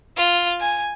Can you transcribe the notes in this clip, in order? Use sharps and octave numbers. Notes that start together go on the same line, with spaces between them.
F4
G#5